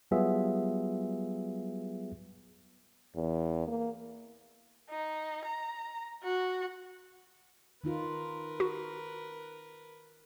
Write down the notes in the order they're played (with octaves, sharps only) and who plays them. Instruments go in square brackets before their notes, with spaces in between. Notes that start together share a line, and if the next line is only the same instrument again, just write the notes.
[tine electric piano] F#3 G3 B3 F4 G#4 E5
[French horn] E2
A#3
[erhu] D#4
A#5
F#4
[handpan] D#3 D#4 F4 [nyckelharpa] A#4 B4
[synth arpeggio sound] F#4